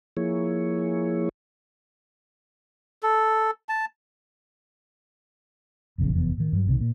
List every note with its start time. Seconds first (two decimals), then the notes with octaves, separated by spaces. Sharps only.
0.17 F3 A#3 E4 G#4 C#5
3.03 A4
3.69 A5
5.98 F1 A#1 E2 C#3
6.13 F1 E2 B3
6.37 A2 D#3
6.53 G2 F#3
6.67 B1 C3 D#3
6.81 A#2